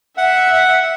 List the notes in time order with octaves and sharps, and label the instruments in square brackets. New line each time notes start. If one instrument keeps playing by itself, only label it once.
[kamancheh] E5 [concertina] F#5